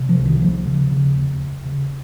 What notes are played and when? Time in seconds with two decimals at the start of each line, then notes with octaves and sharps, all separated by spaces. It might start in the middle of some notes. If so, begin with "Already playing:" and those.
Already playing: C3
0.09 F3
0.18 C2
0.26 D#3
0.42 D#2 F3
0.67 C#3
0.91 C#3
1.16 D#2
1.40 D#2
1.65 C#3